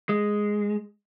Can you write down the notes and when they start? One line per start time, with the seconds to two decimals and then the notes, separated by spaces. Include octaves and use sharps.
0.09 G#3